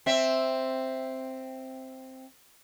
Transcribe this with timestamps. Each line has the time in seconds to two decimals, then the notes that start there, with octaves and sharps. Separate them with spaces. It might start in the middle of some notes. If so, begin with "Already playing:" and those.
0.06 C4 E5